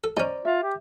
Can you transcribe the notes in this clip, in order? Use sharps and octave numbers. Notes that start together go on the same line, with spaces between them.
A4
C#4 D#4 C5 D5 A#5
F4 E5
G4